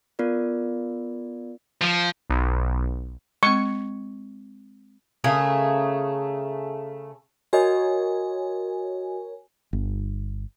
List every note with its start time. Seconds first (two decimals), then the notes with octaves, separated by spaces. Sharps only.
0.19 B3 F4 A#4 D5
1.81 F3
2.30 B1
3.43 G#3 C4 C#6
5.24 C#3 A3 G#4 A#4
7.53 F#4 A#4 C#5 D#5 G#5
9.73 G1